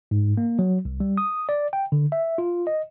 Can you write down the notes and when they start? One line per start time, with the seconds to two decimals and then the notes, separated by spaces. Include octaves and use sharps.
0.11 G#2
0.37 A#3
0.59 F#3
0.85 C2
1.00 G3
1.18 D#6
1.49 D5
1.73 G5
1.92 D3
2.12 E5
2.38 F4
2.67 D#5